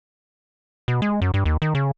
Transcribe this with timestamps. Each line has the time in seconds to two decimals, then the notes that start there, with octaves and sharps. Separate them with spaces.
0.88 B2
1.02 G#3
1.22 F#2
1.34 G2
1.45 D#2
1.62 D#3
1.75 C#3